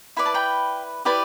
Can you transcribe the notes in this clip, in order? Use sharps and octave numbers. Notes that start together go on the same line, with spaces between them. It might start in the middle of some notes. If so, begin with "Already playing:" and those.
E4 B4 D5 B5
A5
G5 B5
E4 G4 B4 D5